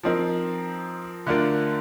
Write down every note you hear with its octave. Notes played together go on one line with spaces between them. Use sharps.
F3 C4 D#4 A#4
D3 A3 D4 F4 A#4